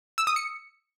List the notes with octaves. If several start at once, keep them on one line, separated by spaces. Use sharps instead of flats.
E6
D#6
C#7